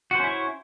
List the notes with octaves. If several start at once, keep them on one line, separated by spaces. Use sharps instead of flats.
C#4 E4 F#4 C5 C#5